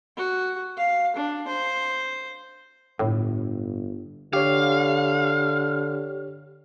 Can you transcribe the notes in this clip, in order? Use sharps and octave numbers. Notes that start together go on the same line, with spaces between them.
F#4
F5
D4
C5
G1 A2
D3 G4 C#5 F5